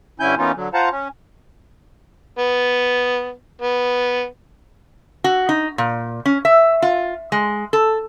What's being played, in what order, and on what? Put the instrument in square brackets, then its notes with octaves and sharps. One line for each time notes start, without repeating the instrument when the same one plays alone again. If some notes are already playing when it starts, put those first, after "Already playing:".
[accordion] G2 D3 C#4 E4 G#5 G6
E3 A#3 B3 C#4 D#4 F4
D3 F#3
F4 C5 F5 F#5 A5 A#5
C#4
[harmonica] B3
B3
[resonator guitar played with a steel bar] F#4
D#4
A#2
C#4
E5
F4
G#3
A4